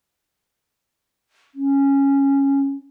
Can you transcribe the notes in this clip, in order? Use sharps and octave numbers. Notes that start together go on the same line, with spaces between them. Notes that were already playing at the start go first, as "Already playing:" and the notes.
C#4